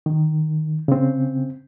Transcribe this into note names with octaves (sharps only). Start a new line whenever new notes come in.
D#3
C#3 C4